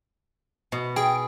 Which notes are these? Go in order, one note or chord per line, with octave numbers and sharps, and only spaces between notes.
B2
G#4 G5